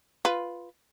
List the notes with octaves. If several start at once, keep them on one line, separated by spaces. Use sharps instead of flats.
F4 B4